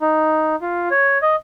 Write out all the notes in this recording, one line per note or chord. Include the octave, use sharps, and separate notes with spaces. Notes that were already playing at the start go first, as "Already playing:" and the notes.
D#4
F4
C#5
D#5